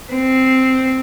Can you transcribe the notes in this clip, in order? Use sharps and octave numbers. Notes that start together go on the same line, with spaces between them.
C4